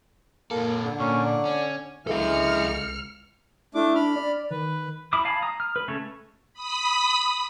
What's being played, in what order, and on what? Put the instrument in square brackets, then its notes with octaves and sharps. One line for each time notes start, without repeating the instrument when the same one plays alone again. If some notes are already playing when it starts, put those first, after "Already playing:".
[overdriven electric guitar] A#2 A4 [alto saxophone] A#3
[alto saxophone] D3
[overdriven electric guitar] A#2 [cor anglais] C#4
[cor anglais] D5
[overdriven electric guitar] C#4
[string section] C#2 F6 C#7 [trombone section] D3 E3 G#3 [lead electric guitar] A4 F5
[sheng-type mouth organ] A3 D4 D6 [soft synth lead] E4
[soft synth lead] D4 [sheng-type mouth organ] B5 F6
[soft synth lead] D5
[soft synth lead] D#3 [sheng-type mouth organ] B4
[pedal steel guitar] E4 B5 D6 D#6
F5 G#5 A5 B5
A#5 D#6
F6
B4
C#3 A3 C#4 A4 C#5
[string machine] B5 D#6 B6